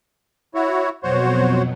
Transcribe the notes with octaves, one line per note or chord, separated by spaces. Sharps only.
E4 F#4 C#5
F2 B2 F#3 F#4 C5 C#5